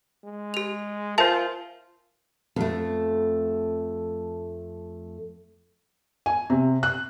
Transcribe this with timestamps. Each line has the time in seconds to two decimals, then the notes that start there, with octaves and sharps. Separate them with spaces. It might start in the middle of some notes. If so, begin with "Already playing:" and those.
0.24 G#3
0.54 G4 F7
1.18 F4 A#4 C5 E5 G#5 A5
2.56 F2 A3
6.26 G#5
6.50 C3
6.83 F#6